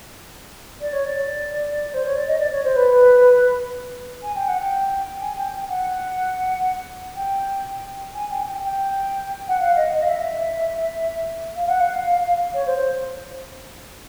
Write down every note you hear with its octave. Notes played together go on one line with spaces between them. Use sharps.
D5
C#5
D5
C5
C#5
D5
D#5
D5
C#5
C5
B4
G#5
G5
F#5
G5
G#5
G5
G5
F#5
G5
G#5
G5
G5
G5
F#5
F5
D#5
D#5
F5
E5
F5
F#5
F5
C#5
C5
C5